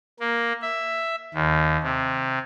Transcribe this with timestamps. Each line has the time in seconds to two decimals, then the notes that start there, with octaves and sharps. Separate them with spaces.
0.19 A#3
0.62 E5
1.34 D#2
1.83 C3